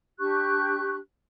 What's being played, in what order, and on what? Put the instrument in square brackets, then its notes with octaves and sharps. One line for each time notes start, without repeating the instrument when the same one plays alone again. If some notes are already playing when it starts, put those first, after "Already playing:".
[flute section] D4 G4 C#6 F#6